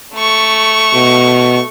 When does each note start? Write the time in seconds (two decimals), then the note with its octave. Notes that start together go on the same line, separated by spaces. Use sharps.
0.14 A3 C#6
0.94 B2